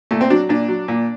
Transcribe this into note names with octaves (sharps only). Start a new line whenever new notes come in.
A#2 A3
C4
F#3 D4
A#2 D4
F#3
A#2